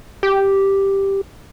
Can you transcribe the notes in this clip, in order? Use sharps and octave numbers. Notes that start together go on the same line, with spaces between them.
G4